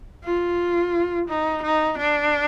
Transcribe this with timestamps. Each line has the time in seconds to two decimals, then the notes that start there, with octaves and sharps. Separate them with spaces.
0.24 F4
1.29 D#4
1.63 D#4
1.98 D4